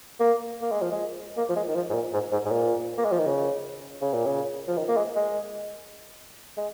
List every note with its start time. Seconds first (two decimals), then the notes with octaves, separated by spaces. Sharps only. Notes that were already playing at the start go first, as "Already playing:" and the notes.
0.20 A#3
0.61 A#3
0.71 G#3
0.82 F3
0.91 G#3
1.37 A#3
1.49 F3
1.56 G#3
1.67 D#3
1.75 F3
1.89 G#2
1.94 A#2
2.13 G#2
2.32 G#2
2.45 G#2
2.51 A#2
2.97 A#3
3.05 G#3
3.11 F3
3.18 D#3
3.27 C#3
4.01 C#3
4.13 A#2
4.26 C#3
4.67 F3
4.77 D#3
4.88 A#3
4.96 G#3
5.16 G#3
6.57 G#3